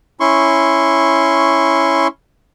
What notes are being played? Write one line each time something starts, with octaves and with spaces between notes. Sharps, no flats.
C#4 E4 C6 C#6